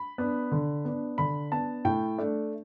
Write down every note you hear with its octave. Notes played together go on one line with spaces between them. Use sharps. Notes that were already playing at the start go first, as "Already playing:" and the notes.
Already playing: B5
B3 D4
D3
B3 D4
D3 B5
B3 D4 A5
A2 G5
A3 D4